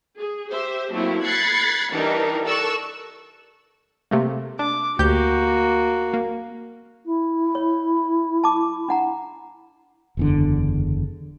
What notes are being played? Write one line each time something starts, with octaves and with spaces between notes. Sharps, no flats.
G#4
G4 C5 E5
F#3 A3 A#3 C4 E4 F4
B5 F#6 G#6 A6 C7 C#7
E3 G3 D4 D#4 A#4
A4 A#4 D5 C#6 E6 F#6
C3 A3 A#3
D4 D6
D2 A#3 F#4 G4 G6
A#3
E4
C#5
A5 D6
D4 F#5 A#5
F#1 E2 D3